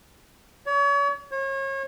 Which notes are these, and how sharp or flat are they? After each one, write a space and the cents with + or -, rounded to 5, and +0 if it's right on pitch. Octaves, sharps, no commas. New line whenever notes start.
C#5 +40
C#5 -35